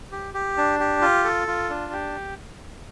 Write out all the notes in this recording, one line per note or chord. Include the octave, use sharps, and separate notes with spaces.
G4
G4
D4
G4
F4
A4
F4
D4
G4